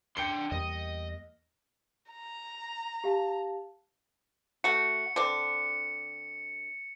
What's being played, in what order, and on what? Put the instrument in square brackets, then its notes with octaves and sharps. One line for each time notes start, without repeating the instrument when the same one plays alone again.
[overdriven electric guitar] D4 C6 [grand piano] G5 C#7 G7
[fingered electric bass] E2 G3 A#3 [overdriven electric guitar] D#5
[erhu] A#5
[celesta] G4 F5 A5
[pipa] A3 F#4 [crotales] C#7
[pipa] D3 C4 D4